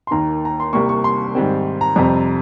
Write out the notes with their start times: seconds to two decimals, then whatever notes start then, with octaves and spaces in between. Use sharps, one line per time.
0.07 C6
0.11 D#2 D#3 A#3 A#5
0.45 A#5
0.60 C6
0.73 C2 C3 G3 A#3 C#6
0.89 C#6
1.04 C6
1.35 G#2 D#3 G3 C4
1.81 A#5
1.96 F2 C3 G3 C4